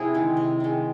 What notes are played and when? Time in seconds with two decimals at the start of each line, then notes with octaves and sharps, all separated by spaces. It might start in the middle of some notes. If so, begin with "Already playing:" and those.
Already playing: C3 E4 G#4
0.14 D#3 G#3
0.37 C3
0.60 D#3 G#3